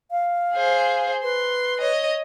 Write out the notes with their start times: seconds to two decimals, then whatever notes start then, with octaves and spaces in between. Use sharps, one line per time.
0.11 F5
0.54 G#4 C5
1.23 B4 C6
1.80 C#5 D#5